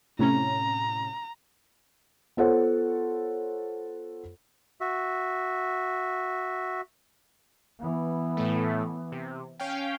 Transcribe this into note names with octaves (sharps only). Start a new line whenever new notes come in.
A2 C3 C#4 A#5
B3 F4 A4 C5 C#5 F#5
F#4 E5
E3 B3
A2 A3
C3
C#4 F5 G5